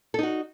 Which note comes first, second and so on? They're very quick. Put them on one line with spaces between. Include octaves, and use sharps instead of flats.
A4 D#4 F#4